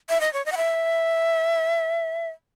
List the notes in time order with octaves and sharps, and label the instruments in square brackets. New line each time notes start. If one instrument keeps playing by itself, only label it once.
[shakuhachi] E5
D#5
C#5
D#5
F#5
E5